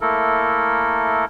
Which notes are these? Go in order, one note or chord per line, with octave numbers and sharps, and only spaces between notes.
A3 A#3 E4 A4 A#4